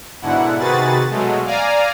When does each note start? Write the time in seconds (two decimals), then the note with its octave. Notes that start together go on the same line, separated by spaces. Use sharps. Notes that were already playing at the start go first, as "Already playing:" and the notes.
0.22 G#2 B2 D3 E4 F#5
0.59 C3 D#3 F#4 G#4 B4 A6
1.09 B2 F#3 G#3 A3
1.45 D5 F5 G#5 A#5